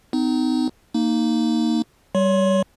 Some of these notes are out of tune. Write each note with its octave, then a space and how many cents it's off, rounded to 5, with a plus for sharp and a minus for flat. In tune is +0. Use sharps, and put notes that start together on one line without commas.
C4 -45 D#4 +0
A#3 -5 D#4 +0
G3 -10 C#5 +20 C6 +20